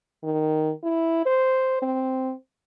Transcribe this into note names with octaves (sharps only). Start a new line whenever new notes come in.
D#3
E4
C5
C4